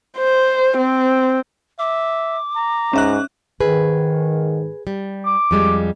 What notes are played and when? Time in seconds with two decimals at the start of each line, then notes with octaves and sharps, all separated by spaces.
0.18 C5
0.77 C4
1.79 E5 D6
2.56 A#5
2.93 G#2 C#4 E5 F#6
3.60 G#2 D#3 G#4 B4
4.87 G3
5.25 D6
5.51 F2 G3 G#3